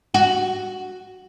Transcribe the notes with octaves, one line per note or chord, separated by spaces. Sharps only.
F#4